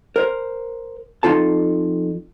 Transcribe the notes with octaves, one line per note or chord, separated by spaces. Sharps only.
A#4 C5
F2 D#4 F4 A4 A5